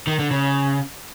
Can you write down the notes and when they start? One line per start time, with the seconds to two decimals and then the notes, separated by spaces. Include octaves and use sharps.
0.07 D#3
0.19 D3
0.31 C#3